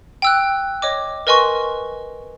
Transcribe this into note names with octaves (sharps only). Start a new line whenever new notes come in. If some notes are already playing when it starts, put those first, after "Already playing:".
G5 E6 F#6
C#5 D#5 D6
A#4 B4 D#5 G#5 C6 C#6